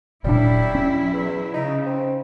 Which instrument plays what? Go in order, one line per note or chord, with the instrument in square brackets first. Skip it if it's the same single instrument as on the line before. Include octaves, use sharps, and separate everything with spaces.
[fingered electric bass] D#1 A#2 D4 [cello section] F#3 E4 [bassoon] G3
[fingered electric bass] C#4
[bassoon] E2
[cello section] C#3 [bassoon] D#4
[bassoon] C4